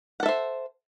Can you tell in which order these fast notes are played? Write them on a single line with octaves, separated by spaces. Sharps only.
F#5 A4 E5 C5